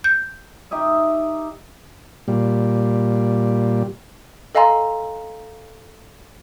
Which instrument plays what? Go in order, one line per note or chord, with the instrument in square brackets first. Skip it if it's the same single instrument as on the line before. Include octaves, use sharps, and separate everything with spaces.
[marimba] G6
[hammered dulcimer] D#4 G4 D#5 E5
[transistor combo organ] A#2 G3
[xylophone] A4 D#5 F5 G#5 A#5 C6